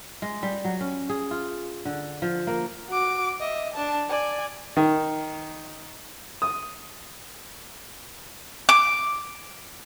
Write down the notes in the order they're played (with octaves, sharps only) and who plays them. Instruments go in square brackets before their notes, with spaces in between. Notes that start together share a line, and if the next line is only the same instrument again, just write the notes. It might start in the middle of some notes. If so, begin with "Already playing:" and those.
[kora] G#3
G3
F#3
C#4
G#4
F4
D3
F3
A#3
[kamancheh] F#4 D6
D#5 E5
D4 A5
D5 G#5
[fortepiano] D#3
D#6
[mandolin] D6